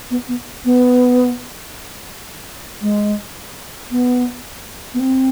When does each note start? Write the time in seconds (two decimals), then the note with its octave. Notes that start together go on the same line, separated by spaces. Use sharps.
0.11 B3
0.28 B3
0.65 B3
2.82 G#3
3.91 B3
4.94 B3
5.00 C4